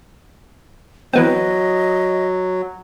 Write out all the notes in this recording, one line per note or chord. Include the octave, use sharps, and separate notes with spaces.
E3 F#3 B3 C4 D#5